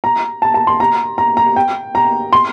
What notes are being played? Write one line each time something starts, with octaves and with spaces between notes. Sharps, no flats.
A#5
A5
A5
C6
A#5
A#5
A#5
G5
A#5
C6